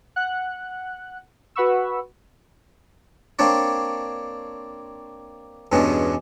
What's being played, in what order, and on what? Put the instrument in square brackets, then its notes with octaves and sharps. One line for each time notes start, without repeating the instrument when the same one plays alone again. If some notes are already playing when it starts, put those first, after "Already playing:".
[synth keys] F#5 F#6
F#4 B4 F#5 B5 C#6 E6
[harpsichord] A#3 C4 D4 C#5 D5
E2 G2 B2 G#3 C#4 D4